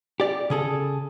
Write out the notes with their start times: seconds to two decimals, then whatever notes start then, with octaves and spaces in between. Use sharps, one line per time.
0.20 G4 D5
0.50 C#3 G#4 A4